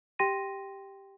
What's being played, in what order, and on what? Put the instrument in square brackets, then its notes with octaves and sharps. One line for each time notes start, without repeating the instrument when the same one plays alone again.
[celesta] G4 G5 C6 A#6 D#7